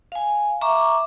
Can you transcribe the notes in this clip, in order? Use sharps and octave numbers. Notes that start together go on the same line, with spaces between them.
F5 G#5
E5 A#5 C#6 D6